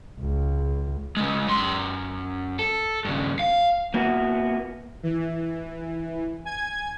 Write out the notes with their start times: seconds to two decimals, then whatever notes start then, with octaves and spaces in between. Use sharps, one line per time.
0.21 C#2
1.17 C#3 G#3
1.48 F#2 C6
2.59 A4
3.05 G2 C#3
3.39 F5
3.94 A#3 B3 E4 F#4
5.03 E3
6.45 G#5 G#6